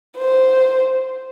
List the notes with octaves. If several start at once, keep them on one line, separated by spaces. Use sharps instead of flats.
C5